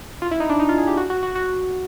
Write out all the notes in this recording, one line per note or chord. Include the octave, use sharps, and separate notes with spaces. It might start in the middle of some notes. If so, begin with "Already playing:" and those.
F4
E4
D#4
D4
D#4
F4
G#4
G4
F#4
F#4
F#4
F#4